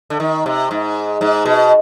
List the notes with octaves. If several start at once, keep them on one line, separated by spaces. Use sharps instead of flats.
D3
D#3
C3
G#2
G#2
B2